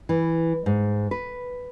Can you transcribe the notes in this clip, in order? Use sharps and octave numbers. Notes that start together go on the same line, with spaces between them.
E3
G#2
B4